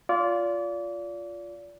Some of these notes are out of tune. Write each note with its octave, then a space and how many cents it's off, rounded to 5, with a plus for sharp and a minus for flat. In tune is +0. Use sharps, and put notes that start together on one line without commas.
F4 +0 D5 -30